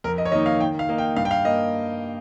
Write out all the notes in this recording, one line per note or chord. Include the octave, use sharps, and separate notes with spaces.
F2 A#4
D#5
C#5
D#3 A#3 D#4 D#5
F5
D#3 G5
F5
A#3 D#4
G5
G2 F5
G5
F5
A#3 D#5